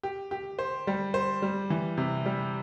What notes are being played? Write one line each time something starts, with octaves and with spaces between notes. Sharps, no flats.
G4
G4
C5
G3
C5
G3
E3
C3
G3